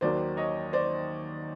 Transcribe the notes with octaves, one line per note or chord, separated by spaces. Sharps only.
D#2 D#3 F#3 A#3 C5 D5
C#5 D#5
C5 D5